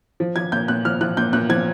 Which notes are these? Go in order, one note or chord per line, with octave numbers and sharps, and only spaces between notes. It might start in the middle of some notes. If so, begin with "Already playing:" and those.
F3
F3 G#6
A#2 G6
A#2 F#6
F3 F6
F3 F#6
A#2 G6
A#2 F#6
F3 G#6